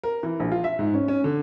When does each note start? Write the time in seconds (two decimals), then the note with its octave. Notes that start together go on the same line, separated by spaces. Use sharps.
0.03 A#4
0.23 E3
0.40 A#1
0.52 F4
0.64 E5
0.79 G#2
0.94 C#4
1.08 C#4
1.24 D3